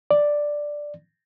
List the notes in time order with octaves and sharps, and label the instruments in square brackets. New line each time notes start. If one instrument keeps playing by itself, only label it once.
[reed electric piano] D5